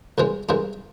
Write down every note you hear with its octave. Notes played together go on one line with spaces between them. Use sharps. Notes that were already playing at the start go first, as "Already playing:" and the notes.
C2 C3 E3 G#3 C#4
C2 C3 E3 G#3 C#4